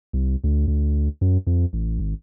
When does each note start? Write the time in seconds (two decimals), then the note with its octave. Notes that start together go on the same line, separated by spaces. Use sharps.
0.13 C2
0.44 D2
0.67 D2
1.21 F#2
1.47 F2
1.73 A1
1.99 G#1